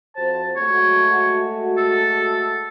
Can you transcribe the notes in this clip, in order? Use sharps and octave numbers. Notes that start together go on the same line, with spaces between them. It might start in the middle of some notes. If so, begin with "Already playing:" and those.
F2 F#4 C5 A5
G#3 A3 F#4 C#5
A4